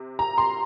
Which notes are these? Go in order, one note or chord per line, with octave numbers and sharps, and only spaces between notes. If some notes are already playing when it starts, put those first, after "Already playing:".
Already playing: C3
A#5
C6